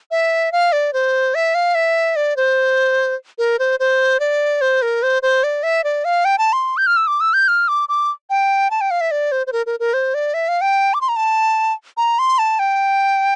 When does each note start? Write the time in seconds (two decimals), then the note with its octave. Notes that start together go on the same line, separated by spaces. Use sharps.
0.11 E5
0.52 F5
0.72 D5
0.93 C5
1.35 E5
1.55 F5
1.75 E5
2.16 D5
2.37 C5
3.39 A#4
3.59 C5
3.80 C5
4.20 D5
4.61 C5
4.82 A#4
5.03 C5
5.22 C5
5.44 D5
5.63 E5
5.84 D5
6.05 F5
6.25 G5
6.38 A5
6.53 C6
6.77 G6
6.87 F6
6.96 E6
7.07 D6
7.20 E6
7.34 G6
7.48 F6
7.68 D6
7.89 D6
8.30 G5
8.71 A5
8.81 G5
8.91 F5
9.01 E5
9.11 D5
9.32 C5
9.47 C5
9.53 A#4
9.66 A#4
9.80 A#4
9.94 C5
10.14 D5
10.34 E5
10.48 F5
10.61 G5
10.94 D6
11.01 C6
11.09 A#5
11.16 A5
11.97 A#5
12.19 C6
12.39 A5
12.59 G5